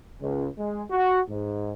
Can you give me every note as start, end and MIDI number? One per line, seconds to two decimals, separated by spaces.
0.21 0.47 37
0.58 0.83 56
0.91 1.20 66
1.29 1.73 44